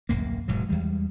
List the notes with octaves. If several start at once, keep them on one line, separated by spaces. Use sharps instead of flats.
D1 A#1 F#2 A#3
E1 G#2 B2 F#3
E2 E3 G3 G#3